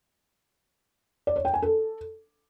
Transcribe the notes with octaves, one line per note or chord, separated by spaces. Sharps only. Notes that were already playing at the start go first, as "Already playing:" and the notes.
D5
C#5
G5
G#5
A4